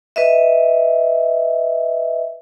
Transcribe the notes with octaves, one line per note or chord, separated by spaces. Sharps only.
B4 D#5 E5